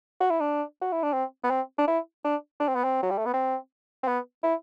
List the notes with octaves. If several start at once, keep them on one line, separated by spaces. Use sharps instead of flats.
F#4
E4
D4
F#4
E4
D4
C4
B3
C4
D4
E4
D4
D4
C4
B3
C4
F#3
G3
A3
B3
C4
C4
B3
E4